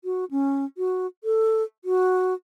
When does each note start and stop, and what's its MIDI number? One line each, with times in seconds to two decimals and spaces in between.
0.04 0.25 66
0.31 0.65 61
0.78 1.07 66
1.24 1.63 69
1.85 2.34 66